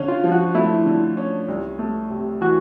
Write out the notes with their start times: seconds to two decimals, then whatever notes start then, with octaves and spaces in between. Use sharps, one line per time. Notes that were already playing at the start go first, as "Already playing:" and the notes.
Already playing: D3 C#4
0.08 F4
0.24 F3
0.32 F#4
0.55 A3 E4
0.86 D3
1.17 C#4
1.48 C2
1.79 A3
2.10 C3
2.41 E3 F#4